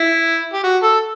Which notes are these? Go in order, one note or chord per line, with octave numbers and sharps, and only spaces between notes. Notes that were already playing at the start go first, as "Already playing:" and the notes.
Already playing: E4
G4
F#4
A4